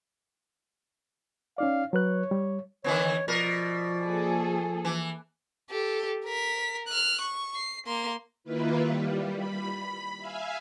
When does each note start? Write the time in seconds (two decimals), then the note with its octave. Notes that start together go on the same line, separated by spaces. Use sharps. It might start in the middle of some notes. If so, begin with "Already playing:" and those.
1.58 C#4 D#4 D5 F5
1.93 F#3 B4 C#5 F#6
2.31 G3
2.84 D3 E3 B3 C#5
3.28 B2 F3 A#4 D5
4.02 A#3 G#4 A4
4.85 E3
5.70 G4 A4
6.25 A#4 B6
6.88 F6 F#6
7.21 C#6
7.56 C7
7.87 A#3 C6
8.44 D#3 A#3 E4 F4 B4
8.78 G3
9.36 B5
10.18 E5 F5 G#5